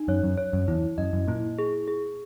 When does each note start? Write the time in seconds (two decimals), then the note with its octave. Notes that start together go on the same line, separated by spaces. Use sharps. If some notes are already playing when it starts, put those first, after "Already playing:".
Already playing: D#4
0.08 F#2 C#5
0.23 F#2
0.38 C#5
0.53 F#2
0.68 E2 E4
0.98 F#2 D#5
1.13 F#2
1.28 A#2 E4
1.59 G#4
1.88 G#4